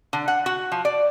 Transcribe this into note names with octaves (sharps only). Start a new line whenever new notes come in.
D3
F#5
F#4
F3
D5